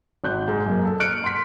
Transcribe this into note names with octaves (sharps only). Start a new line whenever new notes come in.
G#1 F#6 G6
G#2
F#2 A#3
A4
F6 F#6 C#7 D7
C6 B6